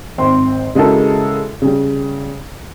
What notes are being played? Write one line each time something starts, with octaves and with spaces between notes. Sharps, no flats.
G#1 C4 C6
C#3 G#3 E4 F#4 A4 A#4
C#3 G3